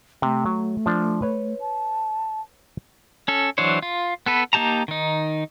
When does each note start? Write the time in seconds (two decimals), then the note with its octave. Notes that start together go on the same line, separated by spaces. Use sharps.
0.22 C3 A3
0.46 F#3
0.86 F3 D4
1.22 B4 C#5
1.60 A5
3.28 C#4 A4
3.58 E3 F#3 D4 C5 C#5
3.82 F4
4.26 B3 A4 B4
4.53 A#3 D#4 G4 A5 A#5
4.88 D#3 D#4